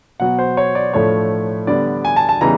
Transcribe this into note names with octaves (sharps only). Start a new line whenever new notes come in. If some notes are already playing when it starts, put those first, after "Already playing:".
B2 F#3 B3 F#5
C5
C#5
D5
A2 F3 A3 D4 C#5
D3 G3 B3 D5
G#5
A5
A5
C#3 E3 G3 B3 D#4 A#5